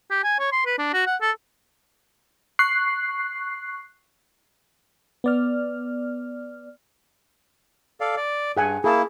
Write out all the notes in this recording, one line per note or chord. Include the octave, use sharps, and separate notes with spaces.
G4
G#5
C#5
C6
B4
D4
F#4
F#5
A4
C#6 F#6 C7
B3 D5 F6
A4 D5 F5
D5
G2 G#4 F#5 G#5
A#3 E4 G#4 A5